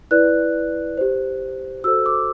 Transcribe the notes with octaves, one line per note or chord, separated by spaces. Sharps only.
E4 B4 D5 F#6
G4 C5
F#4 A4 C5 E6
D6